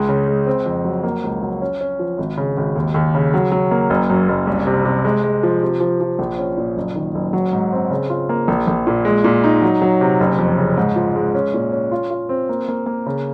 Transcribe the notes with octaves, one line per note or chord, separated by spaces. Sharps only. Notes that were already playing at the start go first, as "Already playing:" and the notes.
Already playing: C#2 G#3
C#3
G#3
C4
F2
F#3
A#3
C#2
F#3
C#4
C#4
F3
G#1
C#3
G#1
D#2
D#2
C#3
F#3
F#3
A#3
F#1
F#2
F#1
C2
C3
C3
G#3
G#3
F3
C3
F3
F3
A#1
C#4
A#2
F#1
D#3
F#1
F#3
G#2
C4
C#3
F4
A#3
A#1
A#1
A#2
G#3
A#2
D#4
F#3
F#3
C3
F#1
F2
C#3
G#2
F3
G#3
C#4
A#2
C#4
F4
F4
C4
A#3
A#3
A#3
C#3